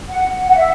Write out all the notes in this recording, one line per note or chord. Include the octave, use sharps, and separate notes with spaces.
F#5
F#5
E5